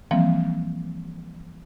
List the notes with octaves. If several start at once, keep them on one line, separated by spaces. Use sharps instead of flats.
E3 F3 G3 A#3 C4